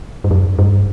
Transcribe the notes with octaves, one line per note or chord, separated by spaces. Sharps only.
G2
F#2
G2